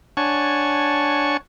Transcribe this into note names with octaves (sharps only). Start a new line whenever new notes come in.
D4 C#5 F#5 G#5 A5 C#6